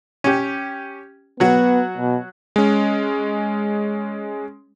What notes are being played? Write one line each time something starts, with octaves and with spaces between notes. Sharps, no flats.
C#4 G4
F#3 B3 F#4
B2
G#3 C#4